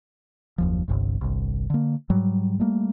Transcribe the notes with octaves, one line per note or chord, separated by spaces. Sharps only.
F#1 D#2 F3
G1 C2 G2
G1 C2
D3 A#3
G#2 F#3 G3
G3 A3 A#3